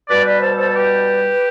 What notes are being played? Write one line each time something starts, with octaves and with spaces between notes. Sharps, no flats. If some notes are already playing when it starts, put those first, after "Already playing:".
B2 G3 B4 D5
B4 D5
A4 C5
A4 C5
G4 B4